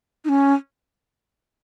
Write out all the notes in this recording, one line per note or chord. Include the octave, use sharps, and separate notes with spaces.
D#4
C#4